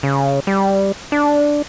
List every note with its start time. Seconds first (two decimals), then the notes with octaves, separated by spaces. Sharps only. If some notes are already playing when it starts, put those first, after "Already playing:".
0.03 C#3
0.47 G3
1.12 D4